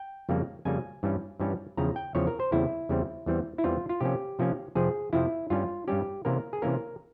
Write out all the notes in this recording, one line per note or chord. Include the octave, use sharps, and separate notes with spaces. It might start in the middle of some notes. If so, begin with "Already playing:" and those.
Already playing: G5
F2 C#3 G3 A#3
F2 C#3 G3 A#3 G#5
G2 E3 G3 C#4
G2 E3 G3 C#4
E2 C#3 F3 C4 A#5
G5
E2 C#3 F3 C4 C#5
A#4
C5
E2 C#3 G3 C4 E4
E2 C#3 G3 C4
E2 E3 G3 C4
E4
E2 E3 G3 C4 F4
F4
C3 F3 A#3 C#4 G4
C3 F3 A#3 C#4
F2 C3 F3 C4 G#4
F2 C3 F3 C4 E4
G2 G3 C#4 F4
G2 G3 C#4 G4
C3 E3 A#3 C#4 A#4
G#4
C3 E3 A#3 C#4 A#4